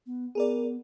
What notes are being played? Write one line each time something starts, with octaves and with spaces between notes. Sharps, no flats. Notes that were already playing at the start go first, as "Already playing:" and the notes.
B3
B3 G#4 A#4 D5